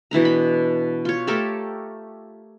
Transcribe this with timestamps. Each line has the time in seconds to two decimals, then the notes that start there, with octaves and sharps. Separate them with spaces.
0.11 B2 E3 D4 A#5
0.25 B5
1.05 F4 C#5
1.27 A3 G4 A4 A#4